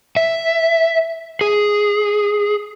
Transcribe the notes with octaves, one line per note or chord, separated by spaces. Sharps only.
E5
G#4